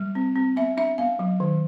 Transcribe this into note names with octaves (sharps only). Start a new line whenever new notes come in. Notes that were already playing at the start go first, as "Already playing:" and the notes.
Already playing: G3
C4
C4
B3 E5
D4 E5
B3 F5
F#3
D#3